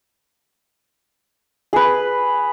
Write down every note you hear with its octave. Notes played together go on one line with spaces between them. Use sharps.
G#4 B4